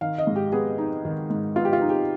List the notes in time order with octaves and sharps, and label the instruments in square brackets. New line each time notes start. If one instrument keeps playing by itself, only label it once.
[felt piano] D#3 F5
D#5
G#2
G4
B3 G#4
D#4
D#3
G#2
B3 F4
G4
F4
D#4
G4